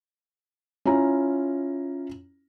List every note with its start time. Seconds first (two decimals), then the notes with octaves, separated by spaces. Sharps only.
0.85 C#4 E4 F4 A#5